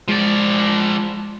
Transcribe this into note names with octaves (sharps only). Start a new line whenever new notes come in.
F3 G#3 D5